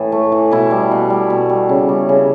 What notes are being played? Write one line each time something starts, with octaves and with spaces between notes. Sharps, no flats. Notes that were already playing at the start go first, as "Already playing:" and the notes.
Already playing: A2 E3
A3
E3
B2 E4
G3
B2
G3
B2
G3
C#3
G3
C#3